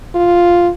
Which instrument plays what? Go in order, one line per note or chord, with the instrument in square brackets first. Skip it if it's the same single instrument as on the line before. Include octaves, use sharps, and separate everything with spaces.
[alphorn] F4